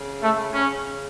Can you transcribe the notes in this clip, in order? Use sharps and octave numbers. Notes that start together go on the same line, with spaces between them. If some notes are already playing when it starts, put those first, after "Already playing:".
Already playing: C#3
A3
C#3 C#4